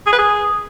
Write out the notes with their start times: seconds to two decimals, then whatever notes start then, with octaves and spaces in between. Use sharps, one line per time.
0.06 G#4
0.12 B4
0.18 G#4